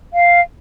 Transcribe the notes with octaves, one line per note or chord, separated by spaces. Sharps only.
F5